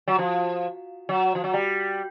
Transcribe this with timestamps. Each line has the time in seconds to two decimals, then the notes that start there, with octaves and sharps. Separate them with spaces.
0.08 F#3
0.18 F3
1.09 F#3
1.35 F3
1.44 F#3
1.54 G3